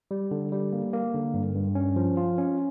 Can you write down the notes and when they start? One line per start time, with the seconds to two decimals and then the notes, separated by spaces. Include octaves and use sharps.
0.11 G3
0.31 D3
0.52 G3
0.73 A#3
0.93 A#3
1.14 D3
1.34 G2
1.55 G2
1.75 C#4
1.96 F3
2.17 F4
2.38 C#4